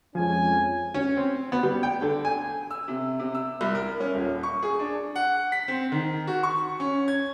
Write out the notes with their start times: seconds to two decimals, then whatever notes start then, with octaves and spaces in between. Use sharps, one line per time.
0.15 F2 F3 G#3 C#4 G#5
0.94 C#4
1.17 C4
1.52 B3
1.63 G3
1.83 G5
2.02 D3
2.25 G#5
2.71 E6
2.88 C3
3.19 C3
3.35 E6
3.61 C2
3.75 A#4
4.00 C#4
4.14 D#1
4.43 C#6
4.63 G#4
4.79 D4
5.15 F#5
5.52 B6
5.68 C4
5.92 D#3
6.27 F#4
6.43 C#6
6.80 C#4
7.08 G#6